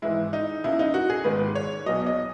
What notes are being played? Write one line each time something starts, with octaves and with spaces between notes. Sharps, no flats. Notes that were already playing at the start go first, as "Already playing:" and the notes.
G#1 G#2 E3 G#3 E4
D#4
C#2 C#3 G#3 E4
D#4
F#4
G#4
G#1 G#2 D#3 G#3 B4
C#5
B1 B2 F#3 D#5
D#5